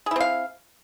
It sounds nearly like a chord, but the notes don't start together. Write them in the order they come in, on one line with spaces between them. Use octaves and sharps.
G#4 E4 C4 F5